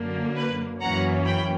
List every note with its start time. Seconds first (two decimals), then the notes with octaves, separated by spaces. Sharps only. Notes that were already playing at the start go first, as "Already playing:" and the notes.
Already playing: F#2 D3 A#3
0.36 B4
0.81 F#2 E3 A#3 C#4 F#5 A#5
1.26 G5 B5